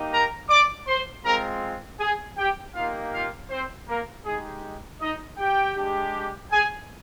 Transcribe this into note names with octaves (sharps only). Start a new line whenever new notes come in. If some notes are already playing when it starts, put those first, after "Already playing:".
Already playing: A#3 D#4 G4
A#4 A#5
D5 D6
C5 C6
G#3 C4 F4 A#4 A#5
G#4 G#5
G4 G5
A#3 D#4 F4 G4 F5
F4 F5
C4 C5
A#3 A#4
G#3 D#4 G4 G#4
D#4 D#5
G4 G5
G#3 D4 G4
G#4 G#5